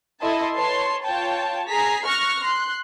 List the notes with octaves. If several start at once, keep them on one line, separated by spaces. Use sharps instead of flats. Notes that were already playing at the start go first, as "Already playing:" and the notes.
E4 A4 D#5 E5 A5 C6
B4 C#5 A5 C6
F4 C#5 G5 A5
G#4 A#5 B6 C7
C#6 F6 F#6 A#6
C6 F#6